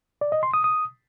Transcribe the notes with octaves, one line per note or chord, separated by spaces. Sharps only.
D5
D#5
C6
D#6
D#6